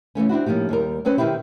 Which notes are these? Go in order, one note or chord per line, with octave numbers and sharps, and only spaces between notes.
C#3 E3 A3 C#4
C4 D4 E4 F#4
A2 F3 A#3 D#4 G4
D#2 G3 A#4
F#3 C4 C#4 B4 C5
B2 D#3 A#3 C4 E4 G4